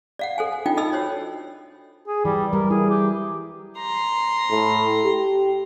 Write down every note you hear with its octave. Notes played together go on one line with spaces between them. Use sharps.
D5 F5 F#5
A4 C5 G#5
G#5
D4 D#4 F4 D5 G5
D#4 A4 D#5 B5 E6
F#4 C5 C#5
G#4
E3 G3
G3 A#4
E4 G#4
G4
A#5 C6
A2
G4